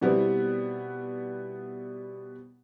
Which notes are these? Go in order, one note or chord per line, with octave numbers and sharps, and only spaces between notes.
B2 G3 B3 C4 E4